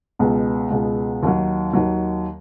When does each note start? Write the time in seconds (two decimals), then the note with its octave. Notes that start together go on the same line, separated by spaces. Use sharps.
0.19 C#2 B2 G#3 B3
0.71 C#2 B2 G#3 B3
1.23 D#2 D#3 F#3
1.73 D#2 D#3 F#3